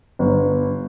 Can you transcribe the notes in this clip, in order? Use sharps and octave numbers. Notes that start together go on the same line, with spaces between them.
G1